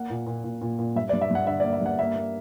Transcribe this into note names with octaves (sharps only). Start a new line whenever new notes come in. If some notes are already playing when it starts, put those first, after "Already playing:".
Already playing: A#3 F#5
A#2
A#2
A#2
A#2
A#2
G2 E5
D5
G2
E5
G2 F#5
D3 E5
D5
A#3
E5
G2 F#5
A#3 E5
A#3